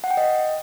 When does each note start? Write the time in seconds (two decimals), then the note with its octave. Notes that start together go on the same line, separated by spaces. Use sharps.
0.04 F#5
0.11 G5
0.17 D#5